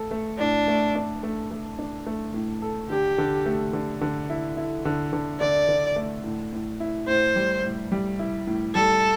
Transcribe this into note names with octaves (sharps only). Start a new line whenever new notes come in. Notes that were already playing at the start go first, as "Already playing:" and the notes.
Already playing: A3 A4
A3
A2 D4
A3
D4
A3
A3
D4
A3
A2
A4
D3 G4
D3
A3
D3
D3
E4
E4
D3
D3
D3 D5
D3
A3
A2
A2
E4
A2 C5
G3
A2
G3
E4
A2
G3 A4